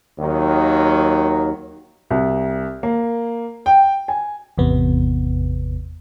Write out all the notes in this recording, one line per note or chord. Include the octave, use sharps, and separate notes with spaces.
D#2 D#3 F#3
C2
A#3
G5
G#5
G#1 E2 C3 B3